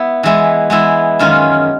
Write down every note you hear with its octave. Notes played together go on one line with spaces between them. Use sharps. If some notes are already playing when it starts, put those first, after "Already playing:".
Already playing: B3 E4
E3 G#3 B3 E4
E3 G#3 B3 E4
F#2 D#3 G#3 C#4 F4